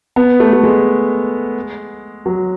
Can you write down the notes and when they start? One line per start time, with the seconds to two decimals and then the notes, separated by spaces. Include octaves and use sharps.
0.16 B3
0.40 A3
0.53 A3
0.63 G#3
2.26 F#3